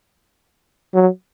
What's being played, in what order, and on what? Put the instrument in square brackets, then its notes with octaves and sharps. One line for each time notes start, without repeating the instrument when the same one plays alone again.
[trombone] F#3